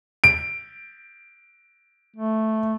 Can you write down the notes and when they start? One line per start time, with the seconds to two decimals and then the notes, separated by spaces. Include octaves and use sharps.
0.24 D7
2.17 A3